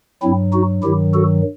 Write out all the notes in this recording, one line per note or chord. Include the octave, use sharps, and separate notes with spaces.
G2 F#3 C4 E4
D#4 F#4
G2 D#3 F#3 E4 G4
F#4 A4